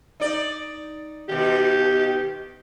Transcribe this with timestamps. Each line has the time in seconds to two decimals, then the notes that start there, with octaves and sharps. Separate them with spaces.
0.20 D#4 D5
1.29 B2 D#3 G4